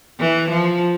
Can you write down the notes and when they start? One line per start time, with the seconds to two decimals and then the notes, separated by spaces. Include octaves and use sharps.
0.19 E3
0.50 F3